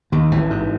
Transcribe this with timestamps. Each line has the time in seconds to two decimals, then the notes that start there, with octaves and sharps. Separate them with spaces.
0.12 D#2 D#3
0.31 A1 E3
0.50 G#2